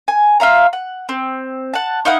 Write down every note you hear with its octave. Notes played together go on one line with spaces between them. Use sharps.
G#5
F4 E5 F5 A#5
F#5
C4
F#5 A5
D#4 E4 F5 F#5